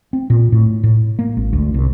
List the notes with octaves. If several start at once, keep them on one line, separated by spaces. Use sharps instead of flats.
C4
A#2
A2
A2
A#3
G#1
D2
C2